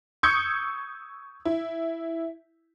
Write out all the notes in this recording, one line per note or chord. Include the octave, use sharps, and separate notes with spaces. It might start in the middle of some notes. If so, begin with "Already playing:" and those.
C#6 D#6 E6 G6 G#6 C#7
E4